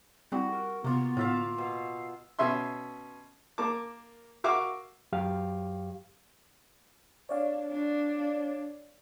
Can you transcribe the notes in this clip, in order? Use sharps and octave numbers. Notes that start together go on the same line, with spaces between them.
G3 C4 E4 F#4 G4
A#4
C3 A#3 B3 F4
A2 D3 F4 E5 F5
B2 F5
B2 C#4 E5 C6
A#3 A#4 A5 D6
F#4 A#4 E5 F5 C#6 D6
F#2 F#3 G4 F5
D4 C#5 D5 F5
D4